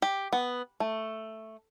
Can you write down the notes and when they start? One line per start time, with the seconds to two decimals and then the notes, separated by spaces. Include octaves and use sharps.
0.02 G4
0.33 B3
0.80 A3